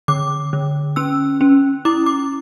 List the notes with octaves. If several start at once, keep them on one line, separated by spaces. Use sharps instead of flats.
D3 D6
D3
C#4 E6
C#4
E4 D6
D6